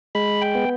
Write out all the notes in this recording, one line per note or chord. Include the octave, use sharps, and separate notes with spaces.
G#3 B5
G5
B3